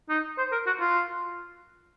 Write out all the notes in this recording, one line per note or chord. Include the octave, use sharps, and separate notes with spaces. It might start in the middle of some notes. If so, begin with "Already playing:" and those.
D#4
C5
A#4
F#4
F4